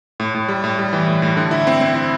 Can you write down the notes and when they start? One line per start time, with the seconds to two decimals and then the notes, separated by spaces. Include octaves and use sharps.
0.20 A2
0.35 A2
0.49 G3
0.64 A2
0.79 G3
0.93 E3
1.08 A2
1.22 A2
1.37 D3
1.51 E4
1.67 C4
1.81 C4
1.95 E4